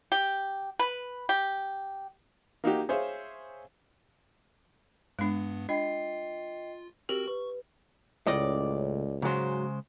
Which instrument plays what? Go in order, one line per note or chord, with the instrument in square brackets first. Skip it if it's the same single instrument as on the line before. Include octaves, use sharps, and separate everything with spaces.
[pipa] G4
B4
G4
[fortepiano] A#3 D#4 F#4 G4
G#4 C5 C#5 E5 F5
[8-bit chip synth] G2 B3 [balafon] G#3 D4
[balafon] D4 [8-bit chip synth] F4 [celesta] D#5 G5 C7
[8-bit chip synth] C4 F#4 A#4 [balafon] G4 [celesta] F#7
[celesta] B4 [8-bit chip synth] C#6
[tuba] C#2 [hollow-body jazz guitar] A2 C#3 D#5 [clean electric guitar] D5
[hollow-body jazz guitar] G#2 F#3 [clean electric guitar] C#3 G#3 C5